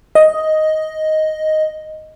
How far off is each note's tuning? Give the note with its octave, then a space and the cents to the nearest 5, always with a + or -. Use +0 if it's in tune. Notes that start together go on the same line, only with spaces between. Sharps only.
D#5 +5